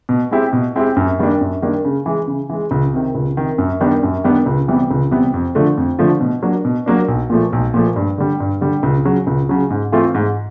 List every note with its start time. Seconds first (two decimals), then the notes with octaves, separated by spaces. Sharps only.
0.09 B2
0.31 G#3 C4 E4 G4
0.53 B2
0.76 G#3 C4 E4 G4
0.96 F#2
1.19 D#3 G3 A#3 D4
1.41 F#2
1.62 D#3 G3 A#3 D4
1.85 C#3
2.06 E3 G#3
2.27 C#3
2.49 E3 G#3
2.71 C#2
2.94 C3 D#3
3.15 C#2
3.37 C3 D#3
3.58 F#2
3.81 D#3 G3 B3 D4
4.03 F#2
4.24 D#3 G3 B3 D4
4.46 C#2
4.68 C3 E3 G3 B3
4.91 C#2
5.11 C3 E3 G3 B3
5.34 F2
5.55 D3 F3 A3
5.77 F2
5.99 D3 F3 A3
6.20 B2
6.42 F#3 A#3 D4
6.65 B2
6.86 F#3 A#3 D4
7.08 B1
7.30 A#2 F3 A3
7.53 B1
7.74 A#2 F3 A3
7.96 G2
8.18 D3 G3
8.40 G2
8.61 D3 G3
8.83 C#2
9.05 C#3 F#3
9.27 C#2
9.49 C#3 F#3
9.70 G#2
9.92 E3 A3 C4 F4
10.15 G#2